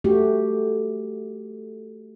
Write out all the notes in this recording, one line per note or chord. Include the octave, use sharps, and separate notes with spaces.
A3 F#4 G4